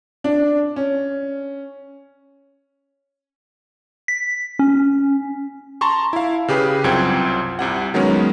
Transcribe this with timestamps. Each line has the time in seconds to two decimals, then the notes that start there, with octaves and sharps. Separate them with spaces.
0.24 D4
0.76 C#4
4.08 B6
4.59 C#4
5.81 A5 A#5 C6 C#6
6.13 E4 F5
6.48 C#3 G4 G#4 B4
6.84 C2 F#2 C4 F4 G5 G#6
7.59 C2 C3 F#5
7.94 D#3 F#3 G#3 B3 C#4